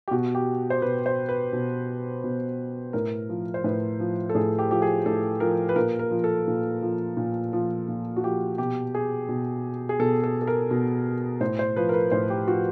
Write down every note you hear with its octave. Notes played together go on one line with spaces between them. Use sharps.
G4
B2 F#4
G4
C5
B2 B4
C5
B4
B2
B2
A2 A#4
F3
C5
A2 B4
F3
A4
A2 G#4
G4
F3 G4
G#4
A2 A4
F3 A#4
B4
A#2 A#4
A#4
F3
A4
A#2
F3
A#2
F3
A#2
F#4
F3 G4
B2 G4
G#4
B2
G#4
B2 A4
A4
A4
A#4
B2
A2 C5
C5
F3 B4
A#4
B4
A2 C5
G4
F3 F#4